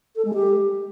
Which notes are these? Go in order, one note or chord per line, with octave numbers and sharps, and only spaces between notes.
A4
G#3
G4